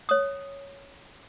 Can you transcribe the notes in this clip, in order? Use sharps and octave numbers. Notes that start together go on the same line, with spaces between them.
C#5 D#6